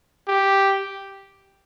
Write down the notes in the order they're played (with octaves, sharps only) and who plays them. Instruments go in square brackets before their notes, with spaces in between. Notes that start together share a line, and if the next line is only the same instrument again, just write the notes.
[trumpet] G4